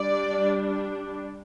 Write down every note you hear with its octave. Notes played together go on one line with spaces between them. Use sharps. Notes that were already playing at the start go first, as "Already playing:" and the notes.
Already playing: G3 D4 D5